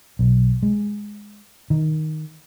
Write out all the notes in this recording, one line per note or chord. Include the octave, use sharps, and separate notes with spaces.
B1
G#3
D#3